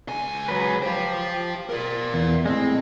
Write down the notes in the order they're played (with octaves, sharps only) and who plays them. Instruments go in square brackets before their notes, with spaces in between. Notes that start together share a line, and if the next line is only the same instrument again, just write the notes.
[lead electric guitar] C#2 G#5
[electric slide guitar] F#3 B4
[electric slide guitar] G4 [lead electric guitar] C5 F5
[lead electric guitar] A#4 D5
[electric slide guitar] E2
[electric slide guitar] A2 G#3 [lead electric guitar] C4